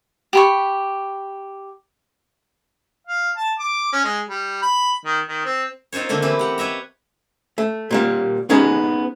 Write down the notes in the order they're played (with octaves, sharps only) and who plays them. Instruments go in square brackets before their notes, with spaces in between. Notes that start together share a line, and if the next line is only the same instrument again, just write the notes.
[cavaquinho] G4 B5 C#6
[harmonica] F5
A5
D6
C#4
G#3
G3
B5
D#3
D#3
C4
[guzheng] C4 D#4 F4 C5 C#5
D3 A3 A#3 C4
E3 C4 E4 G4 B4
G4 F#5
B4 C#5 D#5 E5 A#5
[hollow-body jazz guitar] A3
A#2 G3 A#3
B3 C#4 D#4 G#4